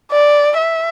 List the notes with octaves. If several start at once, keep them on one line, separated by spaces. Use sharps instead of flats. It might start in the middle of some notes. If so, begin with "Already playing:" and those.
D5
E5